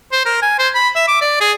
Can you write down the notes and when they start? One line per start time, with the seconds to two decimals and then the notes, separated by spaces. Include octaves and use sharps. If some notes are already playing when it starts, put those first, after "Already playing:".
0.12 C5
0.25 A#4
0.42 G#5
0.59 C5
0.74 B5
0.96 E5
1.08 D6
1.21 D5
1.41 G#4